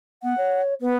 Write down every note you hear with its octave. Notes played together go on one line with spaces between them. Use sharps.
B3 F#5
C#5
B3 B4